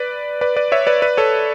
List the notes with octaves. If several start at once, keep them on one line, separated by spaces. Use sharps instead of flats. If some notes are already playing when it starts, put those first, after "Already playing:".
Already playing: B4 D5
B4 D5
B4 D5
C#5 E5
B4 D5
B4 D5
A4 C#5